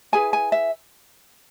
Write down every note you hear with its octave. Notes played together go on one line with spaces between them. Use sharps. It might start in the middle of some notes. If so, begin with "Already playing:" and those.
E4 G#4 B4 G#5
G#5
E5